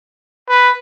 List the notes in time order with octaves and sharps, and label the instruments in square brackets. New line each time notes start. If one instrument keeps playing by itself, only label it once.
[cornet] B4